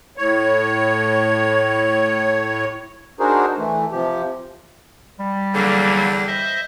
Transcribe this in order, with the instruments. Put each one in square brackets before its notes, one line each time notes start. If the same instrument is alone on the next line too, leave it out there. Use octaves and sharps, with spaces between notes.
[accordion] A2 C#5
[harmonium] D4 D#4 F#4 G#4 A#4 C5
E3 A3
C3 F3 G4
[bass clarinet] G3
[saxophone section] E2 D3 [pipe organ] F#3 A#3
[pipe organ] C5 D#5 E5